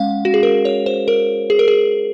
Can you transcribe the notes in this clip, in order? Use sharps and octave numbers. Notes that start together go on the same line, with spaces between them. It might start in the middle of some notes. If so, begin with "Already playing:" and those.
Already playing: G#3 C#4 F5 F#5
F#4
G#4
A#4
C#5
C5
A#4
G#4
A#4
G#4